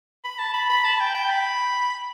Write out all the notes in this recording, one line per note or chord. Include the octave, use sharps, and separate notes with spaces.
B5
A5
B5
B5
A5
G5
G5
B5